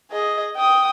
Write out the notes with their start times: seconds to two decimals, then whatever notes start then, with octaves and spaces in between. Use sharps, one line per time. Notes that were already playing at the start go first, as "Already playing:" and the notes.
0.11 G#4 D#5
0.56 G5 D#6